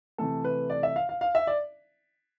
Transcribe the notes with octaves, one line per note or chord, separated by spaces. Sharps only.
C3 E3 A3 A4
B4
D5
E5
F5
F5
F5
E5
D5